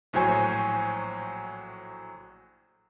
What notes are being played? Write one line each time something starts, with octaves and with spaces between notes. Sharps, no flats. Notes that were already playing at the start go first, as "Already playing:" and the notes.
A#1 A2 F#3 C5 G#5 C#6